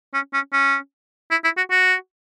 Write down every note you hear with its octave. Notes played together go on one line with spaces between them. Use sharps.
C#4
C#4
C#4
E4
E4
F#4
F#4